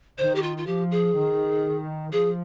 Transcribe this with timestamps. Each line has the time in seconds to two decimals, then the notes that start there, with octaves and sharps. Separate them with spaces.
0.18 D#3 C5
0.35 G4
0.42 F4
0.57 F4
0.66 F3 G4
0.91 G#4
1.15 D#3
2.12 F3 G#4